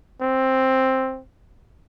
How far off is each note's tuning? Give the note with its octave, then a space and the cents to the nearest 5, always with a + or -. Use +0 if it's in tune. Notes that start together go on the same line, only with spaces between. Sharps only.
C4 +10